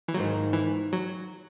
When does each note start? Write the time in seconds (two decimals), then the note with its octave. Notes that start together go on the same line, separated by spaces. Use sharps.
0.08 E3
0.14 G#2 D#3 F#3 A#3
0.53 E3
0.93 F#3